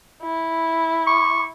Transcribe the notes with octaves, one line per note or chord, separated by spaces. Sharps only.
E4
C#6